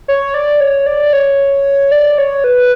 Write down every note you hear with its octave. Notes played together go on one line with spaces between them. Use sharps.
C#5
D5
C#5
D5
C#5
D5
C#5
B4